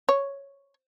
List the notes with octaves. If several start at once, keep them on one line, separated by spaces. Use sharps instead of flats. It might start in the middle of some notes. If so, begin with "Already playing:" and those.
C#5